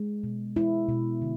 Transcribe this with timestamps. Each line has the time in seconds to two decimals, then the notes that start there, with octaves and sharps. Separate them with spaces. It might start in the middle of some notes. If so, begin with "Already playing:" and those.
Already playing: G#3
0.23 B2
0.56 G#3 E4
0.89 B2
1.22 D3